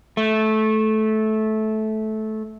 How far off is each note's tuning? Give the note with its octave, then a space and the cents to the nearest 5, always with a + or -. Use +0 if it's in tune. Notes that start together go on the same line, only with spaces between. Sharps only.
A3 -15